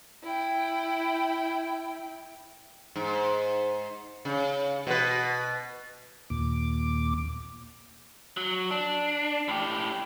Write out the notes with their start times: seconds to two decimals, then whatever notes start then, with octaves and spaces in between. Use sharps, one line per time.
0.24 E4 G5
2.96 G#2
4.25 C#3
4.87 B2 B4
6.30 D#2 A#2 D6
8.37 F#3
8.71 D4
9.48 A2 G4